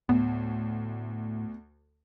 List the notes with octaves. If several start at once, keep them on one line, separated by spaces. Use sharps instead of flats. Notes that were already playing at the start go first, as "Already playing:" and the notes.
D2 A2 B3